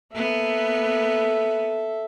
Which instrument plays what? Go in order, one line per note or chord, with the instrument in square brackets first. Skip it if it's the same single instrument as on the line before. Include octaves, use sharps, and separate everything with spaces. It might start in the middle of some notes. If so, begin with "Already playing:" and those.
[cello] A#3 B3 [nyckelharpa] A4 E5